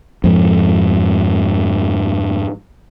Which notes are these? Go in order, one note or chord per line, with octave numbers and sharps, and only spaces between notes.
F2 G#2 F3